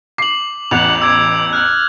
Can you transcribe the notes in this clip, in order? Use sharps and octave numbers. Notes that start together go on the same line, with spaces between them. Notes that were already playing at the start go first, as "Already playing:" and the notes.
D6 C7 F#7
A1 E2 F#5 F7
D6 E6 G#6
F6 F#6